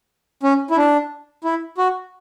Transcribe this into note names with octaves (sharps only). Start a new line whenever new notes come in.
C#4
E4
D4
E4
F#4